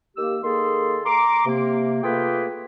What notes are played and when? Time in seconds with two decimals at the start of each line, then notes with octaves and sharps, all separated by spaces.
0.17 D#3 A#3 G4 E6
0.44 D#3 A#3 G#4 A4 C6
1.06 A#5 C6 D6
1.46 C3 A#3
2.03 A3 A#3 F4 G#4 B4 G5